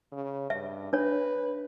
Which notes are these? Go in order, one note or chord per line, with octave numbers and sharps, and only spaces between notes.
C#3
G2 E5
D4 B4 C#5